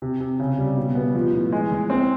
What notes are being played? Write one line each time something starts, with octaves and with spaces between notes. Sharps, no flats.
C3
C3
C#3
G3
B2
B3
F3
A2
G#3
E3
C4